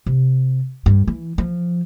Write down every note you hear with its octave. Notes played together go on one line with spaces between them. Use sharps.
C3
G2
E3
F3